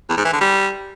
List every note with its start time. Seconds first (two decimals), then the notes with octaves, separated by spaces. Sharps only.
0.09 E2
0.17 G#2
0.25 E3
0.33 D3
0.40 G3